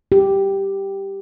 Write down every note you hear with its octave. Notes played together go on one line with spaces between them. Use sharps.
G4